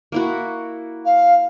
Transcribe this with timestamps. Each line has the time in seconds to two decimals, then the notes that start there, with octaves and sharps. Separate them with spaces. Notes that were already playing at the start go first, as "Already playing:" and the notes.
0.12 A#3 E4 F#4
1.05 F5